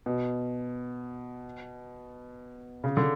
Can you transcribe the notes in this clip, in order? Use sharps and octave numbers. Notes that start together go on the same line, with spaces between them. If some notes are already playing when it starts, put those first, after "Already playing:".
B2
C#3
D3